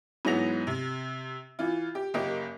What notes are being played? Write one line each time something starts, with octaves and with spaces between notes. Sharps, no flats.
G#2 E3 F#3 B3 A#6 F7
C3
E3 F4
G4
F#1 A#3 G4 D#5